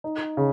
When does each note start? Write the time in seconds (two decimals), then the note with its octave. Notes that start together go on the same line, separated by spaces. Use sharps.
0.04 D#4
0.37 C#3